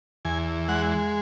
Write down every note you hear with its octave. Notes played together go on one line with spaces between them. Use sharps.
E2 G#5
G#3 F#5